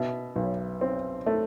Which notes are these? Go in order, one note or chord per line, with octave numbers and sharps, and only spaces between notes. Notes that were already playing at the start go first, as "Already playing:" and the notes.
Already playing: B2 E5
B1
C4
A3